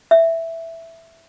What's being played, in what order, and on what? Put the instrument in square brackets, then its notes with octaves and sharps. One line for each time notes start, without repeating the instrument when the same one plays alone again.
[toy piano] E5